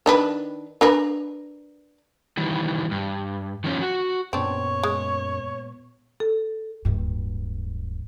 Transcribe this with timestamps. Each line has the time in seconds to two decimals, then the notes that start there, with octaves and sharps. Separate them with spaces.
0.06 D#3 D4 B4
0.81 D4 A#4 B4
2.37 D#3 E3 G3
2.91 G2
3.64 D#3 F3 C#4 F4
3.81 F#4
4.33 F#2 A#2 B3 C4 D4 C#5 C#6
4.83 G#3
6.20 A4
6.85 D1 G2